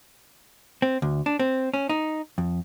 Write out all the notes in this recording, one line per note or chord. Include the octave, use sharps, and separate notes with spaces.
C4
D2
D4
C4
C#4
D#4
F2